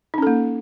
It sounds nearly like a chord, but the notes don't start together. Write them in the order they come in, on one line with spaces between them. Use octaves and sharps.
D#4 C#4 A4 A#3